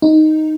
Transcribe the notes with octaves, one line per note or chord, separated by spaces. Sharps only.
D#4